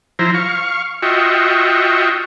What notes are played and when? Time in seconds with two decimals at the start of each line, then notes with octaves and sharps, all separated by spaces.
0.19 F3 E4 C5 A#5
0.34 F5 C#6
1.02 F4 F#4 D#5 E5 G5 C#6